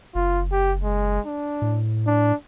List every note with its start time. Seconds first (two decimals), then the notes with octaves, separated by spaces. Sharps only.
0.15 F#1 F4
0.52 G4
0.83 G#3
1.26 D4
1.62 A2
2.07 D4